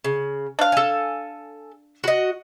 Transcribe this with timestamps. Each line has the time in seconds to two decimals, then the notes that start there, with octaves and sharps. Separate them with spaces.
0.04 C#3
0.59 D4 F5
0.72 A4 G#5
2.04 F#4 D#5